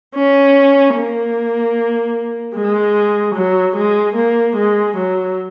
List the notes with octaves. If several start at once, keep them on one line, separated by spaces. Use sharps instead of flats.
C#4
A#3
G#3
F#3
G#3
A#3
G#3
F#3